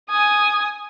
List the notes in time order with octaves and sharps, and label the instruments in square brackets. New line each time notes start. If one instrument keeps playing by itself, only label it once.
[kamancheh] G#5 D#6